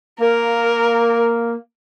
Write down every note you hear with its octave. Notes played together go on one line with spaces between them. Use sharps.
A#3 A#4